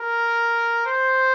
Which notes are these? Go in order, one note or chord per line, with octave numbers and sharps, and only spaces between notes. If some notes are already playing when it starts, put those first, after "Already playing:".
Already playing: A#4
C5